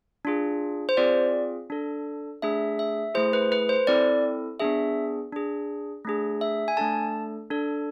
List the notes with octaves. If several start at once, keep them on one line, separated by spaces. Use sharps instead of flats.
D4 F4 G#4
C5
C4 F4 G#4 D5
D4 A4
A3 D4 G#4 E5
E5
A3 E4 G#4 C5
B4
B4
C5
C4 E4 A4 D5
B3 D4 G#4 E5
D4 G#4
A3 D4 G#4
E5
G#5
A3 D4 A4 A5
D4 A4